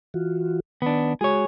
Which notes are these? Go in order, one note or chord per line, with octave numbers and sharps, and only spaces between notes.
E3 F4 F#4
D#3 B3 D4
G#3 F#4 G#4 C#5